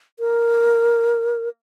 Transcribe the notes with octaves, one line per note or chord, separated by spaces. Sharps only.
A#4